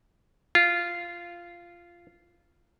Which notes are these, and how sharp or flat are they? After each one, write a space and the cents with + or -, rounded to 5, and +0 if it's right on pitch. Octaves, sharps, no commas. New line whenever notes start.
F4 -10